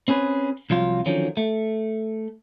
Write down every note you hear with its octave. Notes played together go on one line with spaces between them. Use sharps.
C4 C#4 G#4 B4
C2 F3 F#3 F4
D3 D#3 F3 F#3 C#4
A3